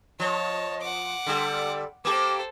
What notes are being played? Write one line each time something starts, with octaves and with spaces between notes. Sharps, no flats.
F3 C#5 D#5 A5
F#5 D6
D3 G3 A4
A#3 G4 A4 C5 D6